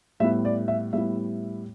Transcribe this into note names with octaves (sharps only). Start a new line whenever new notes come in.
A2 G3 B3 E4 E5
D5
E5
A2 G3 B3 E4 E5